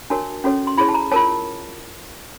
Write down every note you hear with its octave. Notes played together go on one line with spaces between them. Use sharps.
D4 F#4 A#4 C#5 A5
C#4 F#4 A4 C#5
C6
E4 G#4 C#5 B5
A5
A#5
F4 A#4 C#5 A5